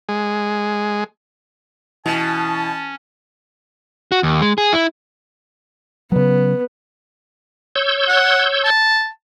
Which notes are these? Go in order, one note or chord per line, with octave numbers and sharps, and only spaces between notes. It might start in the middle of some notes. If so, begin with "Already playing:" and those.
G#3
B2 E3 C#4 A5
F#4
D#2
G#3
G#4
E4
C#3 F#3 B3
C#5 E6 G6
F#5
A5